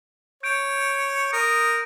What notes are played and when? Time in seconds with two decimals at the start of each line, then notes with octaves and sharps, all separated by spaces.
0.43 C#5 G6 D7
1.33 A#4 D#6